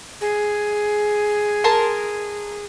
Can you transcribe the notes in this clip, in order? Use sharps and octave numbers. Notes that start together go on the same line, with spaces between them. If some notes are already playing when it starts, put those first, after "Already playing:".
G#4
A#4 A5 C6